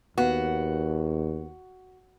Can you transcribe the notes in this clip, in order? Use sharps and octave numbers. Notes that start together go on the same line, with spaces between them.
D#2 B3 F#4 F5